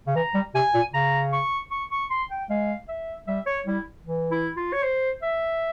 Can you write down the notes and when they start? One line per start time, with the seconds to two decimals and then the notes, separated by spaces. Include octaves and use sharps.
0.07 C#3
0.15 E3 A#5
0.34 G3
0.54 C3 G#5
0.74 A#2
0.93 C#3 A#5
1.32 C#6
1.71 C#6
1.91 C#6
2.10 C6
2.30 G5
2.50 G#3 F5
2.88 E5
3.27 G3 E5
3.46 C#5
3.66 G3 E4
4.05 E3
4.31 E4
4.56 F4
4.73 C#5
4.83 C5
5.22 E5